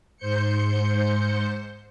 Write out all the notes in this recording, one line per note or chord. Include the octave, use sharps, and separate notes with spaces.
G#2 C5 G6 C#7